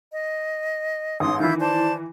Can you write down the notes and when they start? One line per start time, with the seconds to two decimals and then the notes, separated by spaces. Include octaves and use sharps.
0.12 D#5
1.20 A1 G#2 C6 D#6
1.40 D#3 E3 E4 F4 G6
1.60 C5 D5 A5